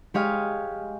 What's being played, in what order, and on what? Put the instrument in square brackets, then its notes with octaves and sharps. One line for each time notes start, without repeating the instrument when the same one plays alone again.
[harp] G#3 G4 C#5 D#5 F5 G#5